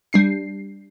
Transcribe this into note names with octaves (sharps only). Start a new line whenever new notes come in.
G3 D4 C7